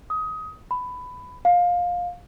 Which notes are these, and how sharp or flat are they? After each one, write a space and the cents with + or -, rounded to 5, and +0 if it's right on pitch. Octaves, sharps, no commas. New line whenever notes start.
D#6 +20
B5 +15
F5 +20